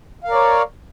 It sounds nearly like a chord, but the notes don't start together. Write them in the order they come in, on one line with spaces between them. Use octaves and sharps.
F5 A#4 D5 C#5